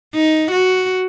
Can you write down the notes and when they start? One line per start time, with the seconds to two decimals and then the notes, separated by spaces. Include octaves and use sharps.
0.15 D#4
0.51 F#4